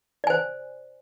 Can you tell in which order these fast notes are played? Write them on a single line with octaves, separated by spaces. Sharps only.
D5 G#5 C5